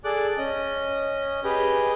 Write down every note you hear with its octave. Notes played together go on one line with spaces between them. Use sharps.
G#4 A4 D5 D6 F#6
C#4 D#5
G4 G#4 B4 D#5 G5